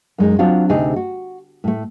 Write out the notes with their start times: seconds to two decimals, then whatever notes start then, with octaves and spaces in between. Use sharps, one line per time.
0.18 F#2 G#3 D#4
0.39 F#3 C4 D4 F4 F#4
0.69 D2 C3 D#4 G#4
0.96 F#4
1.64 A2 A3